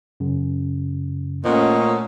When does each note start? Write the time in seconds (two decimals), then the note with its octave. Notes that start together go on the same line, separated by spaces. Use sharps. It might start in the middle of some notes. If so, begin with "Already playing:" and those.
0.20 F#2 C#3
1.45 A#2 A3 C#4 C5 D#5 F#5